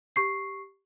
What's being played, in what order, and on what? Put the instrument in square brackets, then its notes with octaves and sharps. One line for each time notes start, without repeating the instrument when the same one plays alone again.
[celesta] G4 C#6 C7